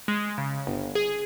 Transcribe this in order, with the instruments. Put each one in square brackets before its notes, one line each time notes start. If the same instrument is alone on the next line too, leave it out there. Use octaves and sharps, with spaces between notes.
[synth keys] G#3
C#3
G1
G#4